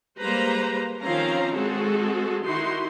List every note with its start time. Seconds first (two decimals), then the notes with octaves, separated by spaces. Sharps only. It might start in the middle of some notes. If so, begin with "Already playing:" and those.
0.19 G3 G#3 A#3 B4 C5 A#5
1.01 D#3 F3 C4 C#4 F5 A#5
1.54 G#3 C4 F#4 G#4 A4
2.44 D#3 D#4 E4 F#4 C6